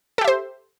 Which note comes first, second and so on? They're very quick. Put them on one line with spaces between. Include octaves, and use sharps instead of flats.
A4 G4 E5 C5